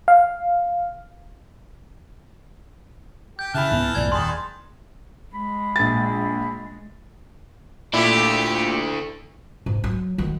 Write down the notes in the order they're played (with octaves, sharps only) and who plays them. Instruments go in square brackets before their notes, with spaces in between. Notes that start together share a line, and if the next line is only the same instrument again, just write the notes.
[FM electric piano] F5
[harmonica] G4 [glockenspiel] G6
[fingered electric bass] C#3 [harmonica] E3 A5 F6 [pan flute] E5 [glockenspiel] B5 F#6
[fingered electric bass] C#2 G#2 B3
[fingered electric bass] B1 F2 A2 [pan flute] D5 [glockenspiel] G#6
[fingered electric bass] D#1 [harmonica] D#3 G#4 A5 [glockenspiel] C6
[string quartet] G#3 [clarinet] B5
[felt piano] A#1 A6
[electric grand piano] A#2 D6 [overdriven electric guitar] A3 D4 [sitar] E4 [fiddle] G4
[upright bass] G#2
F#3
D#3 F#3